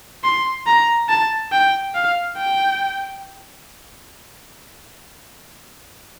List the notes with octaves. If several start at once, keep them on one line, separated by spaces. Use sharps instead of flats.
C6
A#5
A5
G5
F5
G5